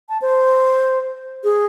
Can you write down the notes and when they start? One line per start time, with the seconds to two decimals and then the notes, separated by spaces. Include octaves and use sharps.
0.09 A5
0.22 C5
1.44 G#4